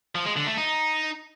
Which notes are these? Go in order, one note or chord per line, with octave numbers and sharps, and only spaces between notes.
F3
G#3
D3
A3
D#4